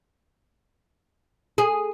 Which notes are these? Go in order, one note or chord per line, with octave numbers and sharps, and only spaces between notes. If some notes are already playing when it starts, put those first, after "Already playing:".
G#4